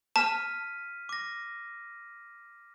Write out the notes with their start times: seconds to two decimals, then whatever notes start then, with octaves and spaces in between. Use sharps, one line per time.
0.16 A5 F6 B6 D#7
1.09 D6 A#6